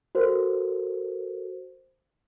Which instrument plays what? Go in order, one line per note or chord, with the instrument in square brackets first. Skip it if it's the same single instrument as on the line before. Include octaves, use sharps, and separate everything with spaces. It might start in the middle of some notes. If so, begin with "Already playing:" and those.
[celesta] F#4 A4 A#4 C5